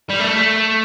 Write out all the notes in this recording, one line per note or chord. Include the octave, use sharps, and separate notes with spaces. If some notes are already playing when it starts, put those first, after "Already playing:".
G3
A3